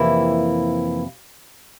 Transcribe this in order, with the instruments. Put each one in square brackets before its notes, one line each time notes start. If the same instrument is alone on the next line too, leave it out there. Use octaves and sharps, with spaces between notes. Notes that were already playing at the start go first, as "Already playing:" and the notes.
Already playing: [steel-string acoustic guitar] F2 C3 E3 A#3 E4